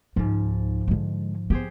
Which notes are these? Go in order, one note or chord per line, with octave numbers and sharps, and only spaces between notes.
C#2 G#2 F3 D#4
D3 G#3
B3 G4 G#4 C5